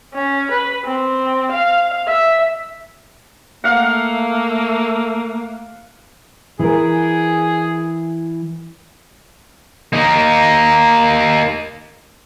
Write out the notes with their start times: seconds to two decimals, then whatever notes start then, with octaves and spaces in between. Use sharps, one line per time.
0.14 C#4
0.51 B4
0.84 C4
1.52 F5
2.07 E5
3.64 A3 A#3 F5 F#5
6.59 E3 G#4 A#4
9.93 A#3 D#4